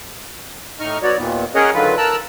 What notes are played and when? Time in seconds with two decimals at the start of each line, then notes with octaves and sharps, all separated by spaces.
0.80 A2 D#4 D#5 C#6 F6
1.02 F#3 B3 F#4 C#5 D5
1.17 D#2 A#2 D#3 B3
1.55 C#4 G#4 A#4 C#5 D#5 F#5
1.74 D3 D#3 F#3 F4 B4
1.97 A#4 A5 A#5 E6 F#6